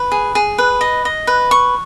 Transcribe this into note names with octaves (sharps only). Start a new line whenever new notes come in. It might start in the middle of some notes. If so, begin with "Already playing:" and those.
Already playing: B4
G#4
G#4
B4
D#5
D#5
B4
C#6